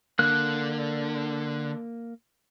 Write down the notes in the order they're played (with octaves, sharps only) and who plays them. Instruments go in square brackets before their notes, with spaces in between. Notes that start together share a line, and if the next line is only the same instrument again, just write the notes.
[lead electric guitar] D3 [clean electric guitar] A#3 [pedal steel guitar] F#6